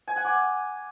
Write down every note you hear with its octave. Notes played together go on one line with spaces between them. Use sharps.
G#5
F#5
D6